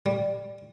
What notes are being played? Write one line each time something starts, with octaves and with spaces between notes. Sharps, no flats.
G3